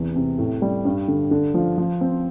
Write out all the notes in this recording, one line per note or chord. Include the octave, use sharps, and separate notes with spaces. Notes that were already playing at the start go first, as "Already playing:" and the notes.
Already playing: E2 C3
C3
A2
G3
G2
D3
D3
F3
F3
C4